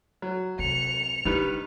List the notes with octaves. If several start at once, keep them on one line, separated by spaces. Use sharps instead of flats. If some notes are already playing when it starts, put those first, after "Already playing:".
F#3
C3 C#7 F7
D#3 G3 D4 B4